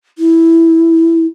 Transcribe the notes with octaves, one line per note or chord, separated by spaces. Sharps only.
E4